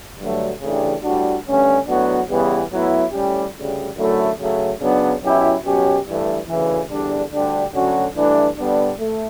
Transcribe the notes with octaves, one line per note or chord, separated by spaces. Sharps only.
G2 D3 F#3 A3
C#3 E3 A3 D4 G4
A2 G3 D4 F#4
G2 D3 A3 C#4
A2 F#3 B3 D4 F#4
C#3 E3 G3 B3
A2 F#3 B3 E4
A2 G3 C#4 G4
D2 C#3 G3
F#2 D3 F#3 A3 E4
C#3 F#3 A3
C#3 F#3 B3 D4
B2 F#3 C#4 E4 G4
B2 F#3 C#4 G4
G2 E3 A3
D2 C#3 E3
E2 D3 G3 D4
D2 D3 G3 D4 G4
D2 D3 F#3 C#4 F#4
G2 E3 A3 D4
D3 G3 B3 D4
A3